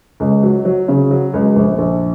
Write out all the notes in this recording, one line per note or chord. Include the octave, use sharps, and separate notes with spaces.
C#2
F#3
F#3
C#3
F#3
C#2
A#1
A#1